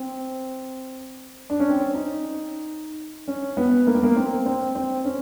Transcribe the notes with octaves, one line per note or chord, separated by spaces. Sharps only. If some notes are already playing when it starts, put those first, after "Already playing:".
Already playing: C4
D4
C#4
C4
C#4
D#4
C#4
B3
A#3
B3
A#3
C4
C4
C4
C#4